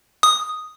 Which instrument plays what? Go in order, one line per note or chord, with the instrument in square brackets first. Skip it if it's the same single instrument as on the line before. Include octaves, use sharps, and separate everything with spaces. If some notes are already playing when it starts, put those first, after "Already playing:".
[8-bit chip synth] D#6